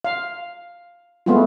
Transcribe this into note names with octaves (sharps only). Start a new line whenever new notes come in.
F5
G#3 A3 B3 C4 F4